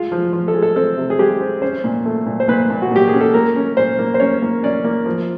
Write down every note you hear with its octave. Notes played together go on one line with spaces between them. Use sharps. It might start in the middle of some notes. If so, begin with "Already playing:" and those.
Already playing: G#3 F4
F3
F3
A4
G#3
A4
C4 A4
C3
G#4
G#3 G4
C4
C#4 C5
A#2
A3
A#2
C5
A#2 B4
A#2
F#4
A#2 G4
G#4
C#4
A4
A#3 A#4
C#4
A#2 C5
A#3
C5
C#4 C#5
A#3
C#4 D5
A#3
F3